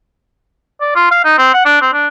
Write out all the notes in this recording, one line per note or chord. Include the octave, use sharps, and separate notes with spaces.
D5
F4
F5
D#4
C4
F#5
D4
C4
D4